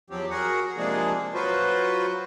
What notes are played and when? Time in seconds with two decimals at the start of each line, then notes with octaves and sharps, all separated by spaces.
0.10 E2 F3 F#3 C4 G4
0.30 F#4 G#4 A#4 F#5
0.77 C3 F3 G#3 A#3 D4 G#4
1.34 F#3 F4 F#4 B4 C5